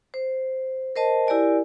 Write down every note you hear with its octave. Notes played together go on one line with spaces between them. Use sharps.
C5
A#4 C5 D#5 A5
E4 G4 A#4 D5 G#5